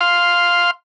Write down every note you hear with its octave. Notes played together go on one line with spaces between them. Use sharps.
F5 C6